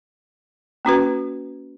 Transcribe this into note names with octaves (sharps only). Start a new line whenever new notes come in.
A#3 C#4 F#4 B4